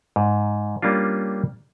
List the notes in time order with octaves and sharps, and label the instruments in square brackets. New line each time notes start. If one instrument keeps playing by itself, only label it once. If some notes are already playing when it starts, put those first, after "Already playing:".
[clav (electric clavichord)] G#2
G3 A#3 C#4 D4 F4